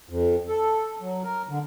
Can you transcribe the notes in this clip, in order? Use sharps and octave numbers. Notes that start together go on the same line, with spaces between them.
F2
A4
F#3
A#4
D3